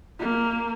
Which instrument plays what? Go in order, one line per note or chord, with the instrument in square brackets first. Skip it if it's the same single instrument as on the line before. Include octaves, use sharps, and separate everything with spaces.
[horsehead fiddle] A#3